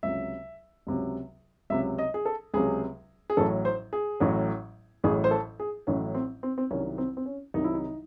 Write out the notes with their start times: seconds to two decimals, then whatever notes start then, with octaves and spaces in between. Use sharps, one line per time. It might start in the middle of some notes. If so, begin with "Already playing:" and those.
0.03 C#2 C3 F#3 E5
0.87 C#2 C3 F#3
1.70 C#2 C3 F#3 E5
1.98 D#5
2.14 G#4
2.26 A4
2.54 C#2 C3 F#3 G#4
3.30 G#4
3.37 A1 A2 F#3 A4
3.65 C5
3.93 G#4
4.20 A1 A2 F#3
5.04 A1 A2 F#3 G#4
5.24 C5
5.31 A4
5.60 G#4
5.87 A1 A2 F#3 C#4
6.15 C4
6.43 C4
6.58 C4
6.71 C2 C3 D#3 F#3 C#4
6.98 C4
7.17 C4
7.26 C#4
7.54 C2 C3 D#3 F#3 D#4
7.64 E4
7.74 D#4